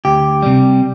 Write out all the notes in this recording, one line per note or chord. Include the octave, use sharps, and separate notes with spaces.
D2 G4
C3 G3